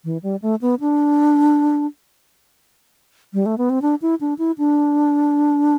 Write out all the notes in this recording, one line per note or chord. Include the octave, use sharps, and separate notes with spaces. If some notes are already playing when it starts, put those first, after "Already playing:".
E3
G3
A3
B3
D4
G3
A3
B3
C4
D4
E4
D4
E4
D4